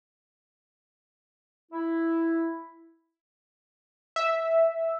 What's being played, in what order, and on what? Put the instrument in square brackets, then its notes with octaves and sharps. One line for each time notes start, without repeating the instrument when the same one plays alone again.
[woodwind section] E4
[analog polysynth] E5